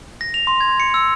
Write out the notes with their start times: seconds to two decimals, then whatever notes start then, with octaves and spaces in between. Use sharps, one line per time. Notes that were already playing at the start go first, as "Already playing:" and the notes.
0.21 A#6
0.34 F7
0.47 C6
0.61 G#6
0.80 C#7
0.94 E6